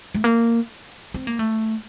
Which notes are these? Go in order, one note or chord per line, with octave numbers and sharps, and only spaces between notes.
A3
A#3
C4
A#3
A3